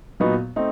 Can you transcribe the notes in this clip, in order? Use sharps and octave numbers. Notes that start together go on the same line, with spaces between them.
A#2 F#3 B3 D#4 F#4
A3 C4 D#4